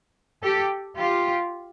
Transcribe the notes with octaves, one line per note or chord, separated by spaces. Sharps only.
G4 A4
F4 G4